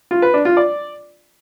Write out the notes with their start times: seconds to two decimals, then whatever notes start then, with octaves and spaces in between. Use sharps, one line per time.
0.11 F4
0.22 B4
0.34 D4
0.45 F4
0.57 D5